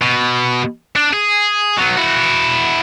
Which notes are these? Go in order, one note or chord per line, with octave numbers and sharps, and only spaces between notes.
B2
D4
G#4
F#3 B3
E4 F#4